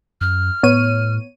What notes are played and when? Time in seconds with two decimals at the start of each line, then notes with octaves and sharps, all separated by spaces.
0.21 F#2 F6
0.63 A2 B3 C#5 D#7